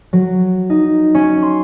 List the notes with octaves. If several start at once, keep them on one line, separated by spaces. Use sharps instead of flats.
F#3
D#4
C#4
C6